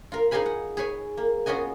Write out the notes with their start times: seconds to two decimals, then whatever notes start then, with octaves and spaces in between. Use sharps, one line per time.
0.12 F4 A#4
0.31 D#4 G#4 D#5 F5 G#5 B5
0.46 F#5
0.77 G#4 B4 C#5 G#5
1.17 A#3
1.46 B3 C#4 F4 F#4 D#5 G#5